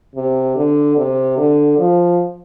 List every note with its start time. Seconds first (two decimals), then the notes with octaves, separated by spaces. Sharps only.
0.16 C3
0.56 D3
0.97 C3
1.37 D3
1.78 F3